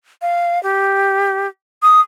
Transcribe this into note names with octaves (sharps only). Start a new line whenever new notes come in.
F5
G4
D#6